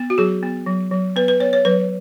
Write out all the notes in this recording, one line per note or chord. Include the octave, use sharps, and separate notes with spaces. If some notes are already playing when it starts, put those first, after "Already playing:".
Already playing: B3
F#4
F#3 G#4
B3
F#3
F#3
B3 B4
B4
B3 C#5
C#5
F#3 B4